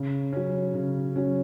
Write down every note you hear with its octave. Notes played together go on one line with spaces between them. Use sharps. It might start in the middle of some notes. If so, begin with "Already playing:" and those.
Already playing: C#3
F#3 C#4
C#3
F#3 C#4